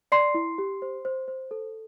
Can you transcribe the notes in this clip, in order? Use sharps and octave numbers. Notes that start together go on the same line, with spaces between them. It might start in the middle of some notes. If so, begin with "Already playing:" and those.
D5 C6 C7
E4
G4
C5
C5
C5
A4